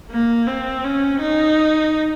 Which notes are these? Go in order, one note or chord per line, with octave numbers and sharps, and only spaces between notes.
A#3
C4
C#4
D#4